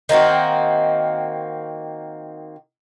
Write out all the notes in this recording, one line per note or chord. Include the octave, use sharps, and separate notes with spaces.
D#3 A#3 C4 F#4